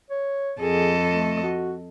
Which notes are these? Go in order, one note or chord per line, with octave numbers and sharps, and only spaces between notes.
C#5
F2 G#4 A4 D#5
A3
F#4